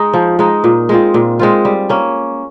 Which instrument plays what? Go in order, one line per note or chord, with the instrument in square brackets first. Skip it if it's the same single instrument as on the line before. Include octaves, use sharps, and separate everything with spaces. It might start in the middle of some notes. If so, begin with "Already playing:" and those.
Already playing: [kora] G#3 D#4
F3
G#3 D#4
A#2
G#3 C4 F4
A#2
G#3 C4 F4
G3
A#3 C#4